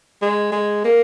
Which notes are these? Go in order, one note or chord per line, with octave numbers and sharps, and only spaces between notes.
G#3
G#3
A#3